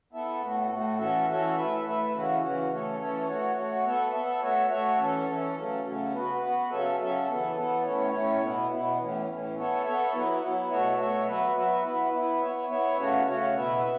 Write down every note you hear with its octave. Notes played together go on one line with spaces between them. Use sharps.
B3 E4 A4 E5
A2 A3 F#4
A2 A3 F#4
E3 C#4 F#4 A4 E5
E3 C#4 F#4 A4 E5
A3 E4 B4 E5
A3 E4 B4 E5
C#3 E3 C#4 F#4
C#3 E3 C#4 F#4
E3 A3 C#4 A4 C#5
E3 A3 C#4 A4 C#5
A3 F#4 C#5
A3 F#4 C#5
B3 A4 E5
B3 A4 E5
A3 F#4 C#5 E5
A3 F#4 C#5 E5
E3 C#4 A4
E3 C#4 A4
C#3 F#3 A3 C#4
C#3 F#3 A3 C#4
B3 F#4 B4
B3 F#4 B4
C#3 F#3 C#4 A4 E5
C#3 F#3 C#4 A4 E5
E3 B3 A4
E3 B3 A4
A2 A3 C#4 E4 C#5
A2 A3 C#4 E4 C#5
B2 B3 E4
B2 B3 E4
A2 E3 C#4
A2 E3 C#4
B3 A4 C#5 E5
B3 A4 C#5 E5
F#3 B3 E4
F#3 B3 E4
B2 A3 F#4 C#5 E5
B2 A3 F#4 C#5 E5
F#3 B3 F#4 B4 E5
F#3 B3 F#4 B4 E5
B3 E4 B4
B3 E4 B4
B3 E4 C#5 E5
B3 E4 C#5 E5
C#3 A3 C#4 F#4 C#5
C#3 A3 C#4 F#4 C#5
B2 B3 E4 B4 E5
E5